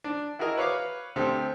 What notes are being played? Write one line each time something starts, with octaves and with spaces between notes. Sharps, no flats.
D4
E4 F#4 G#4 A#4 D#5
B4 C#5 F5 D6
D2 C4 G4 A4